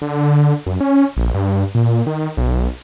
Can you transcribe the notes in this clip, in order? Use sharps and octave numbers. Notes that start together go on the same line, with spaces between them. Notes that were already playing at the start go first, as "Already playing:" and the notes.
D3
F#2
C#4
A#1
G2
A#2
D#3
B1